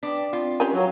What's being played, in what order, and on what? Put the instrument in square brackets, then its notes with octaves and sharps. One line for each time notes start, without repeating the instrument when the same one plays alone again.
[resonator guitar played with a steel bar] D4 [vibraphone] B4 G5
[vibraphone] C4 [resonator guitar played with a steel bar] F4
[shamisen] C#4 G4 G#5
[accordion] F#3 [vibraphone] F#4 F5 G5